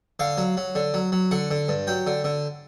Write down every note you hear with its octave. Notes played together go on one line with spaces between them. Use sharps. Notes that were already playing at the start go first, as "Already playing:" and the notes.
D3 F5
F#3
F#3
D3
F#3
F#3
D3 F#5
D3
G2
F#3 G5
D3
D3